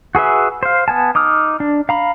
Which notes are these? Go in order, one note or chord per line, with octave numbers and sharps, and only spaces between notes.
F#4 G#4 B4 E5
C5 F5
B3 G#5 A5
D#4 D6 D#6 F6
D4
F5 A#5 B5